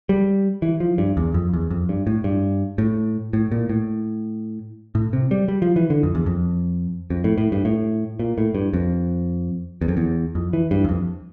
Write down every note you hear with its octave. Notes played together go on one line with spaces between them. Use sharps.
G3
E3
F3
G2
E2
F2
E2
F2
G2
A2
G2
A2
A2
A#2
A2
A2
C3
G3
G3
F3
E3
D3
F2
E2
F2
F2
A2
A2
G2
A2
A#2
A2
G2
F2
E2
F2
E2
F2
E3
G2
E2
F2